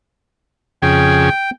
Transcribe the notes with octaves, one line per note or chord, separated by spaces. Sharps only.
F2 C#3 G#4 G5